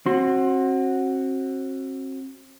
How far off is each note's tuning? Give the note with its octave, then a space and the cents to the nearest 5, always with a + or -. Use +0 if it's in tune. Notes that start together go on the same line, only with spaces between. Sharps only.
C4 +40 F#4 +0 C6 +15